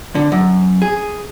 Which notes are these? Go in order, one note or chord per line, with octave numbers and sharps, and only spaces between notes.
D3
F#2
G#4